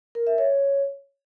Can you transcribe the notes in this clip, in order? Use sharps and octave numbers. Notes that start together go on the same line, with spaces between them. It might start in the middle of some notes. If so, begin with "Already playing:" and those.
A#4
E5
C#5